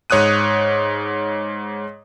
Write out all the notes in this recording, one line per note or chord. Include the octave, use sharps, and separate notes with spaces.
G#2 C#5 D#6 F#6 D#7